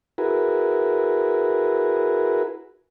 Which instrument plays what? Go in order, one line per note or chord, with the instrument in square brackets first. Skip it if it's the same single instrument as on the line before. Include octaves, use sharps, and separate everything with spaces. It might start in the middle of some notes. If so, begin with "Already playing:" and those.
[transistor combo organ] E4 F#4 G#4 A#4 B4